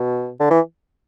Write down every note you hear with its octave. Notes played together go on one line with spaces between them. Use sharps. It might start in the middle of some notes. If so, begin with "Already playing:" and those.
Already playing: B2
D3
E3